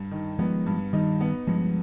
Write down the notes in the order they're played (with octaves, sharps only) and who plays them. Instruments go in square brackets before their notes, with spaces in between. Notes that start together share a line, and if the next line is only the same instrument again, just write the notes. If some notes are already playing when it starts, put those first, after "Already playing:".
Already playing: [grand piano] G2
D#3
[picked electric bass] F3 G#3 [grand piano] B3
[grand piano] G2
[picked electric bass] D#3 G3 [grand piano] D#4
[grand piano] B3
[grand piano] G2 [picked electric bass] F3 G#3